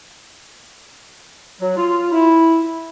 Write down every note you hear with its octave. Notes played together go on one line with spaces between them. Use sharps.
F#3
F4
E4